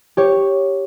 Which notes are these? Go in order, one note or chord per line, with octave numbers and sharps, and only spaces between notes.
G4 C#5